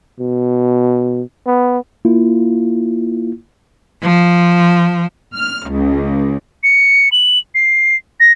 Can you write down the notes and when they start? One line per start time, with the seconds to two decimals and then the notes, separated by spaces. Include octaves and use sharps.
0.20 B2
1.46 B3
2.05 A#3 E4 F4
4.02 F3
5.34 F6
5.70 C#2
6.63 C#7
7.12 F#7
7.55 C7
8.20 A#6